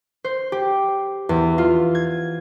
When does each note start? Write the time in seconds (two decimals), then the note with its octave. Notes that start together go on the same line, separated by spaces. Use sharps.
0.24 C5
0.52 G4
1.29 E2
1.58 F4
1.95 G#6